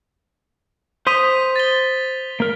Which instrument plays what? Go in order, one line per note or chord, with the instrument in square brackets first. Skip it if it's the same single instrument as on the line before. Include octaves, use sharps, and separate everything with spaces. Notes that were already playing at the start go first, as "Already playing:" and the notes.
[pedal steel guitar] C5 C6 D#6 [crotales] B6 D#7 F7
[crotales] A6 G7
[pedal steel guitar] A#3 A#4